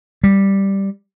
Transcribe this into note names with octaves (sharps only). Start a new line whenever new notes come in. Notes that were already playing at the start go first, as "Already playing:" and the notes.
G3